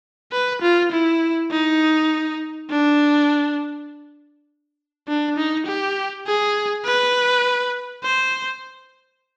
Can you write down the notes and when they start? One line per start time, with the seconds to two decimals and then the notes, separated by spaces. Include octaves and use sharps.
0.32 B4
0.62 F4
0.92 E4
1.51 D#4
2.70 D4
5.08 D4
5.36 D#4
5.66 G4
6.27 G#4
6.85 B4
8.04 C5